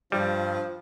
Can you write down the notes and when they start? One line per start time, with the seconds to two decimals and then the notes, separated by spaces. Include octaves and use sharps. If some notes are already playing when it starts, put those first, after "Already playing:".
0.12 G2 F3 G3